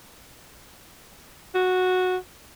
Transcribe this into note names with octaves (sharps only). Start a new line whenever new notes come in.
F#4